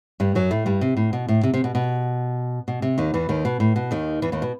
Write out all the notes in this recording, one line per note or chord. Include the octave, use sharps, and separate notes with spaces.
G2 G3
F#2 F#3
A2 A3
G2 G3
C3
A2
B2
A2
C3
C3
B2
B2
B2
C3
D#2 D#3
E2 E3
D#2 D#3
B2
A2
B2
D#2 D#3
E2 E3
D#2 D#3
B2